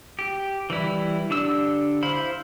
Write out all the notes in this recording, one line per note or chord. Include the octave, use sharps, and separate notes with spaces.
G4
E3 G3 E4
D3 D4 G4 E6
E4 C5 F5 B5